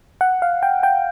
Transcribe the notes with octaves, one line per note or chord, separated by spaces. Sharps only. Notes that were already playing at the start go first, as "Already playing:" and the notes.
F#5
F5
G5
G5